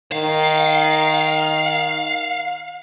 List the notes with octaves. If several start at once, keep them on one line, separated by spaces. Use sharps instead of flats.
D#3 F5